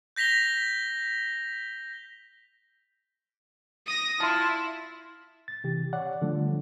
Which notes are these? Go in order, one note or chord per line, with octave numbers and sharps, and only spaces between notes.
G6 A#6 B6 F7 G7
D#6 A#6
E4 F4 A5 C6
A6
C3 E3 G4
C#5 D5 F#5
D3 F3 G3 A3